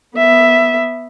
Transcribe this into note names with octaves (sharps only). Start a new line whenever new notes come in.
B3 E5